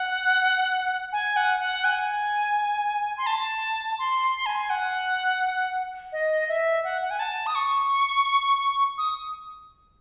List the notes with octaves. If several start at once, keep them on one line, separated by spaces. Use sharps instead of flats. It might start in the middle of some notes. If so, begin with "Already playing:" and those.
Already playing: F#5
G#5
F#5
F#5
G#5
C6
A5
C6
C6
G#5
F#5
D#5
E5
F#5
F#5
G#5
A5
D#6
C#6
D#6